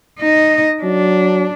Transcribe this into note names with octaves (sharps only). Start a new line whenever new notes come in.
D#4 D#5
F#3 D4